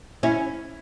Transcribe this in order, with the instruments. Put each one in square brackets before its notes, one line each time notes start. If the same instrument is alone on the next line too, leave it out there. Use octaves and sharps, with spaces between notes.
[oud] C#4 [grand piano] E4